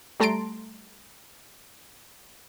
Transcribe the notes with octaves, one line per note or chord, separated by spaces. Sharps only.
G3 A3 A5 A#5 C6 D7